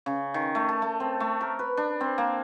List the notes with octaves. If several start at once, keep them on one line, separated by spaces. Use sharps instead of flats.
C#3
D#3
A3
A5
A3
C4
A3
A#4
B4
D4
C4
A#3